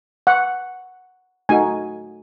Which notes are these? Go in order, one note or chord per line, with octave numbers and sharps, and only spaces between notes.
F#5
A3 D#4 F#4 G#5